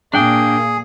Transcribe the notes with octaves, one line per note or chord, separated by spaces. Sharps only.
A#2 A#3 D4 G#4 G5